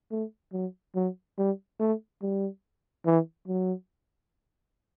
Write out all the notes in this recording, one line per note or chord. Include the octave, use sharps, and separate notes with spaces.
A3
F#3
F#3
G3
A3
G3
E3
F#3